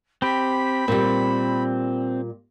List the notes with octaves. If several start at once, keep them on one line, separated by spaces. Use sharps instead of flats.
C4 G4 B5
A#2 G3 C4